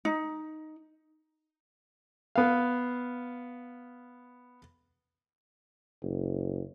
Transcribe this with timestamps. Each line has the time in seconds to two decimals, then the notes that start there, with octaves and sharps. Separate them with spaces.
0.05 D#4
2.36 B3 F5
6.02 F#1